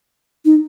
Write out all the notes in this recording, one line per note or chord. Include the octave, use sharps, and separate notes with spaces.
D#4